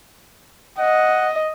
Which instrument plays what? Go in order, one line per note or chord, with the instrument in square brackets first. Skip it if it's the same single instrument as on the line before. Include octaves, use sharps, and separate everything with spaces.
[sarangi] D#5 [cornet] F#5